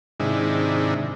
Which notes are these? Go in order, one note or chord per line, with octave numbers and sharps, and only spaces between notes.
G#2 C3 D#3 G#3 D4 E4